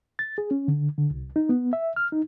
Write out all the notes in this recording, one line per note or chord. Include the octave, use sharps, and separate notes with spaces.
A6
G#4
C#4
D3
D3
C2
D#4
B3
E5
F6
D#4